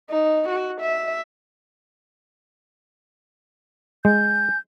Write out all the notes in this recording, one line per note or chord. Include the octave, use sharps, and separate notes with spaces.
D#4
F#4
E5
G#3 G#5 G6